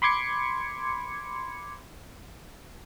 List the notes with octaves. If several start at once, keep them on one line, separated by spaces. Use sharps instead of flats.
B5 C6 D6 G#6 C#7